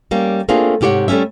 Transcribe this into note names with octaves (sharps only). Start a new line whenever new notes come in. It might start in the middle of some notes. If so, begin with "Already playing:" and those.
G3 A#3 C#4
A3 A#3 C4 D4 F4 G#4
G#2 C3 G4 C5 C#5 F#5
G3 A3 A#3 C#4 E5